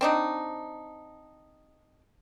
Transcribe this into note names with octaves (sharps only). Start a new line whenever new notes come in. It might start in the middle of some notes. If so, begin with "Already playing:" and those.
C4 D4 D#4